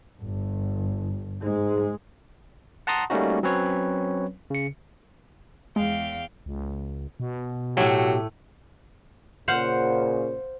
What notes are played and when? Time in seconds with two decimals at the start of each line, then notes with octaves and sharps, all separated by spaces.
0.22 G1
1.43 G#2 G#3
2.87 F#5 A5 A#5 C6 D#6
3.10 G3 A3 A#3 C#4 D#4 F#4
3.43 F#3 C4 C#4 B4 C#5
4.50 C#3 C#7
5.76 E2 G#3 F5 G5
6.46 C#2
7.20 B2
7.77 A2 F#3 A3 G4
9.48 A#2 C#3 C5 F5 F#5